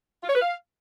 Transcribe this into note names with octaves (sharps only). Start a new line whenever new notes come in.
F4
C#5
B4
F5